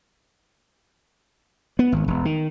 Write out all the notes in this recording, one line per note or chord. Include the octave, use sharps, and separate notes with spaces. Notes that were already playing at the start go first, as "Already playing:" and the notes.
B3
G#1
E1
D#3